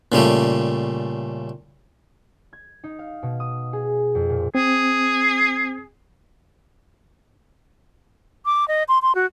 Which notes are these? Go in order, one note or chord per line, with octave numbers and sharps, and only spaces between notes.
A#2 C#3 G3 A3
G#6
D#4
F5
B2
D#6
G#4
F2
A#2
C4 G#4
D6
D#5
C6
C6
F#4